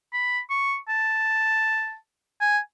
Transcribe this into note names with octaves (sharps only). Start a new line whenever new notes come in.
B5
C#6
A5
G#5